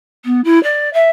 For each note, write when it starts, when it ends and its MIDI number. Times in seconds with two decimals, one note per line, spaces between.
0.25 0.41 59
0.44 0.61 64
0.63 0.91 74
0.93 1.10 76